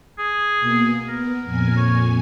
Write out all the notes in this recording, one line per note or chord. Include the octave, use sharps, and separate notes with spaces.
G#4
B2 A#3
B3 A#4
F2 A#2 G#5
C#5